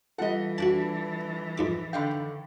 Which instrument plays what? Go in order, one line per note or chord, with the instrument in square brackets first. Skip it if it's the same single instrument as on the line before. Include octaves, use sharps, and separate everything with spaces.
[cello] E3 [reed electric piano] G3 F4 A4 [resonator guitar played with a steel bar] D#5 F#5
[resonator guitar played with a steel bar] D4 [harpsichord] F#4 G5 A5
[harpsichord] F2 G#2 D6
[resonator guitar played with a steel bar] D3 D#3 F5 [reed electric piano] G5 B5